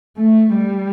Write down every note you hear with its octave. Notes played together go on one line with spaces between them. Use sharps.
A3
G3